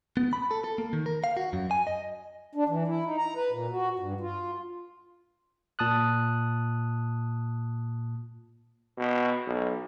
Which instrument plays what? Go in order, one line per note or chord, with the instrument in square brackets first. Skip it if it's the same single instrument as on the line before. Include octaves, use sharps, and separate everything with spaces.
[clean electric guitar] B3
B5
A4
A4
A#3
D#3
A#4
F5
F#4
F#2
G#5
D#5
[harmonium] D4
E3
E4
D#4
A#5
B4
A#2
F#4
G2
F4
[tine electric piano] A#2 A5 D#6 F#6
[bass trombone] B2
B1